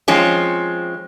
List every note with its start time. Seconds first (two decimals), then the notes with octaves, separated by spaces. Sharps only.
0.08 F3 G#3 C4 C#4